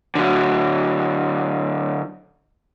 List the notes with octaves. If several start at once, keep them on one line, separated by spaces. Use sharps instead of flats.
D3 F#3